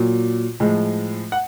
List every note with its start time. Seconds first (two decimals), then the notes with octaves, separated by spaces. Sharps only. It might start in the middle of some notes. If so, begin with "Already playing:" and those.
Already playing: A#2 F#3
0.60 A2 F3 G#3
1.32 F#5